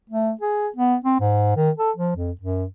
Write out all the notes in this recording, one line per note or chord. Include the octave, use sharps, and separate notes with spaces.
A3
G#4
B3
C4
G#2
D#3
A4
F3
F2
F#2